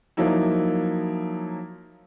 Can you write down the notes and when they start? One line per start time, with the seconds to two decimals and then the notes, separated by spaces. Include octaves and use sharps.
0.17 F3 F#3 A#3 D#4 E4